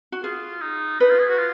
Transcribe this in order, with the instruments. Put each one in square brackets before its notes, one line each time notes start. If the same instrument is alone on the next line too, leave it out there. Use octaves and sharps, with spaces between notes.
[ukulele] F#4
[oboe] F4 [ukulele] G#4
[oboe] D#4
[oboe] D#4 [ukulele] B4
[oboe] F4
G#4
F#4
F4